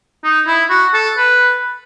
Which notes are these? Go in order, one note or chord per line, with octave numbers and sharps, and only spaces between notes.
D#4
E4
F#4
A4
B4